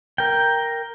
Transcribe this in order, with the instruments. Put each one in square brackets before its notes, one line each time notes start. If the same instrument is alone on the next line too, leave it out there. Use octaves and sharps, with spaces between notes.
[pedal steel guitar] A#4 G5